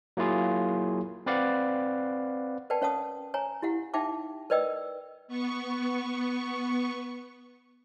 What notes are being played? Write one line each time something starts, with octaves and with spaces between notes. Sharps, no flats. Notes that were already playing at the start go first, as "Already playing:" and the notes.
F#3 A#3 E4 F4 G#4
C4 B4 D5 F5 F#5
A#4 B4 D5 F#5 G5 A5
C#4 C#5 F5 F#5 A5 D#6
C#5 G#5 A#5
E4 G4 F5 F#5
D#4 E5 F5 G5 A5 D6
A#4 B4 D5 D#5 G5 E6
B3 C#6